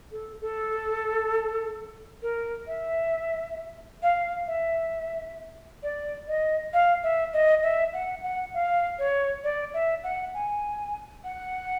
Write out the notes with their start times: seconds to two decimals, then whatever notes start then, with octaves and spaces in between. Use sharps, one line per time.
0.12 A4
0.41 A4
2.22 A#4
2.67 E5
4.03 F5
4.47 E5
5.83 D5
6.28 D#5
6.73 F5
7.03 E5
7.33 D#5
7.63 E5
7.94 F#5
8.24 F#5
8.54 F5
8.99 C#5
9.44 D5
9.74 E5
10.04 F#5
10.34 G#5
11.24 F#5